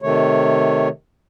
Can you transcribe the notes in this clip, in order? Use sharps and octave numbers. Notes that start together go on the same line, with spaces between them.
C3 D#3 A3 C#5